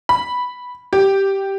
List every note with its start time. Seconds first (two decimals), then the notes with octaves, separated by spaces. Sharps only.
0.09 B5
0.93 G4